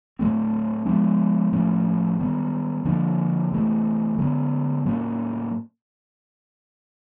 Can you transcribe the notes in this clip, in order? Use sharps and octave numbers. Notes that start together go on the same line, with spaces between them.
A2 F#3 A3 C4
F3 G#3 B3 D4
A2 F3 A3 C#4
D#3 G3 B3
D3 F3 A#3 D4
C3 E3 A3
D3 F#3 B3
A2 F#3 A#3 C#4